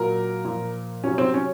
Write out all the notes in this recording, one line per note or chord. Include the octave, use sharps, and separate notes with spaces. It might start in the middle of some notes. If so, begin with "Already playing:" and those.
Already playing: A#2 F#3 A#4
A#2 F3
C3 F#3 C#4
C4
C#4